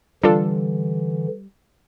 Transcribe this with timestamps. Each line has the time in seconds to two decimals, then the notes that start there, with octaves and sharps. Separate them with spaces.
0.23 D3 E3 G3 D4 F4 A4